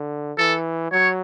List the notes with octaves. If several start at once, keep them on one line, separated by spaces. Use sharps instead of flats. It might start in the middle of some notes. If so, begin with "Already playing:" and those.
Already playing: D3
E3 A4
F#3 C#5